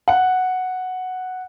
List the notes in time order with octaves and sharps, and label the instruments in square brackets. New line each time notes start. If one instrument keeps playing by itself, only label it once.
[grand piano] F#5